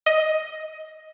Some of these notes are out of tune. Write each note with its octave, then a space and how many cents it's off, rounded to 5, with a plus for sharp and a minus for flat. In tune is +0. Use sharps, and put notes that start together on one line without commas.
D#5 +10